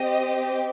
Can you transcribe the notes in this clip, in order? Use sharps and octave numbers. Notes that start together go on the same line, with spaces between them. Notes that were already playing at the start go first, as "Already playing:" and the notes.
Already playing: C4 G4 D#5